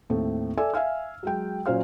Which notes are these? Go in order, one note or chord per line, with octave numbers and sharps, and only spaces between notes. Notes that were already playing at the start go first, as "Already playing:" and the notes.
D#2 A2 C4 A4
A4 D5 E5 G#5 E6
E5 F5 G#5 F6
F#3 G#3 G5
A#2 F#3 C#4 C5 F5 F6